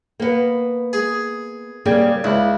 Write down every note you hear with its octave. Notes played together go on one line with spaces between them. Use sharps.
A#3 B3
G#4
C#3 G3 A#3
C#2 E4